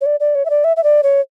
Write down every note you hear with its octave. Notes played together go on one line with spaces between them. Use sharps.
C#5
D5
D5
C#5
E5
D5
E5
E5
D5
C#5